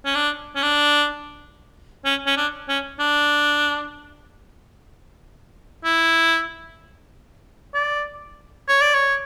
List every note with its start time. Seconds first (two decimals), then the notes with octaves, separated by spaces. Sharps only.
0.05 C#4
0.15 D4
0.55 C#4
0.63 D4
2.05 C#4
2.27 C#4
2.37 D4
2.69 C#4
2.99 D4
5.84 E4
7.74 D5
8.68 C#5
8.81 D5
8.94 C#5